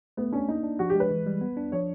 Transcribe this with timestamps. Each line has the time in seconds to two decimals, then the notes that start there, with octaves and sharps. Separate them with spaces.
0.17 A3 B3
0.32 C#4 D4
0.49 A#3 D#4
0.63 D4
0.79 F3 F#4
0.90 G4
0.95 G#3
1.00 B4
1.11 E3
1.27 G3
1.41 B3
1.57 D4
1.72 F3 C#5